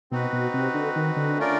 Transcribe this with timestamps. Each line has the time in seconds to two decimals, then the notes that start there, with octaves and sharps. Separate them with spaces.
0.11 B2 C4 D#4 F#4 B4
0.33 B2
0.54 C3
0.74 D3
0.96 D#3
1.16 D3
1.37 A3 C#4 F4 A#4 D5